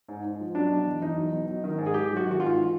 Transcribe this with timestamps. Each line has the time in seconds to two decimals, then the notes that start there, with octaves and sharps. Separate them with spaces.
0.08 G#2
0.24 G#2
0.40 F3
0.55 F#3 D4
0.70 B2
0.86 E2
1.01 E2 D#4
1.17 F#3
1.32 B2
1.47 F#3
1.64 D#3
1.78 G#2
1.86 G#4
1.94 G#2 G4
2.10 F#3
2.17 F#4
2.25 D#3
2.31 F#4
2.40 G#2 F4
2.56 E3